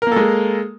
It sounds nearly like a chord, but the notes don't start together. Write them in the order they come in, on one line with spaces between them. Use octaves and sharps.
A#4 A#3 A4 G#3